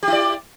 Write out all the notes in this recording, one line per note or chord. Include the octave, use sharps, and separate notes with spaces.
E4 G4 D5